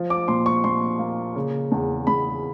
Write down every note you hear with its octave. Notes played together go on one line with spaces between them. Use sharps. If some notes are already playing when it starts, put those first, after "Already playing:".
Already playing: F3
D6
A#2 C6
C#6
A#2 C6
A#3
C#3
E2
E2 B5